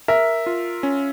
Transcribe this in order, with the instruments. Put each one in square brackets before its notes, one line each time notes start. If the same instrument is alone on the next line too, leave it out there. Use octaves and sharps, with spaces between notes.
[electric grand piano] A#4 [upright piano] E5
[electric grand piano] F4
C#4